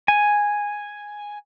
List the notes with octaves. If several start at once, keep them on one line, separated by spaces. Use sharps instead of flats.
G#5